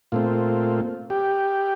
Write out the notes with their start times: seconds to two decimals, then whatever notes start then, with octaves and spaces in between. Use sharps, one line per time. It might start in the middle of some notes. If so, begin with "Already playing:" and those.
0.12 A#2 A3 C4 F4
1.10 G4